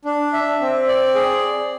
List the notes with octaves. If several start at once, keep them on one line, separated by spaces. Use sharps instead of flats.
D4
E5
C4
D5
G#4